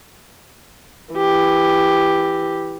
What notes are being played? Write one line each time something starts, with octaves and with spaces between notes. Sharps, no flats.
E3 G4